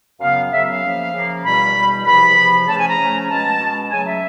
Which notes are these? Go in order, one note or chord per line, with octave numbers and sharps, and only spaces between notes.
F#2 C#3 F#3 B3 F5
F#2 C#3 F#3 B3 E5
F5
C#3 F3 A#3
C#3 F3 A#3
E2 B2 G3 B5
E2 B2 G3
E2 C3 F3 B5
E2 C3 F3
C#3 F3 A3 C#4 A5
G#5
A#5
C#3 F3 A3 C#4
B2 G#3 C#4 A5
B2 G#3 C#4
C#3 F#3 A3 G#5
E5